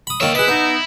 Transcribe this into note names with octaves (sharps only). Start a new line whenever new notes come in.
B5 D#6
D#3 A#3 C#5 D5 E5
E4 G#4 B4 D#5
B3 D#4 B4